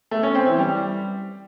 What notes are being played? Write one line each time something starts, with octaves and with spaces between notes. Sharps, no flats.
A3
C#4
C4
E3
G3